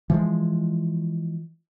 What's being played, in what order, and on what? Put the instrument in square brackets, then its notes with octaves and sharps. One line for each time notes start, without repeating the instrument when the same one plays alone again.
[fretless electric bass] E3 F3 G#3